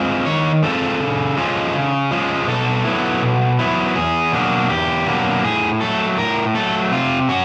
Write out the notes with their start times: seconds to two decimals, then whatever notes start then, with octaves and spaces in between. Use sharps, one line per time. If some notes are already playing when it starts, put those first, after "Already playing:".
Already playing: G#3 C4 F4
0.26 D#3 C#5
0.63 G#3 C4 F4 A4
1.00 C#3
1.37 F3 G#3 C#4 F4
1.73 C#3
2.11 F3 G#3 C#4 F4
2.47 B2 A4
2.84 F#3 B3 E4
3.23 B2
3.59 F#3 B3 E4
3.96 E2 G#4
4.32 B2 F#3 A#3 D4
4.70 E2 G4
5.07 B2 F#3 A#3 D4
5.44 A2 G#4
5.81 F#3 A3 A4
6.18 A2 A#4
6.55 F#3 A3 A4
6.92 C3 F4
7.29 C#4 F#4